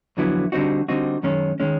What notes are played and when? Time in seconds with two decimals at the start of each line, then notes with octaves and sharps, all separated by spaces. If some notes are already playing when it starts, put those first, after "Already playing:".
0.17 F2 D3 F#3 B3 E4
0.52 D3 G3 C4 D#4 F#4
0.88 D3 G3 C4 D#4 F#4
1.23 F#2 D#3 G#3 C#4
1.60 D#3 G#3 C#4